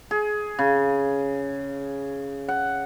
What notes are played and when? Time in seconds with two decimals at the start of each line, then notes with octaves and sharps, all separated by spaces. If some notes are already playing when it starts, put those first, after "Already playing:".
0.11 G#4
0.59 C#3
2.48 F#5